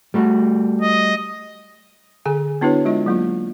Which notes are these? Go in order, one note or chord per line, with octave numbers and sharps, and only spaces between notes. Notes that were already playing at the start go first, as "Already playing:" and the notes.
G3 A3 F#4
D#5
D3 G#4 G#5
B3 D4 E4 F#4 B4 C#5
G#3 F4 D#5
F#3 A#3 F4